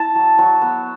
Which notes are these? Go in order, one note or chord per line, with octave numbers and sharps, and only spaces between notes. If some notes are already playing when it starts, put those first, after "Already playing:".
Already playing: E4 A5
F#3
F#3 C#6
B3